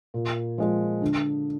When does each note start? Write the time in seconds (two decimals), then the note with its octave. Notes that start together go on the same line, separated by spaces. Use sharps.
0.14 A#2
0.58 F3 G#3
1.02 D3